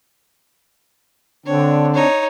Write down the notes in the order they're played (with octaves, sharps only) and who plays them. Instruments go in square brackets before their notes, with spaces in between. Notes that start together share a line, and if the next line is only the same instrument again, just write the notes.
[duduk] D3 [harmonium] C4 D4 [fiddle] C#5
[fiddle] D#4 C#5